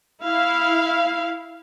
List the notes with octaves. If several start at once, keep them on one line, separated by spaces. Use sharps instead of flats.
E4 F5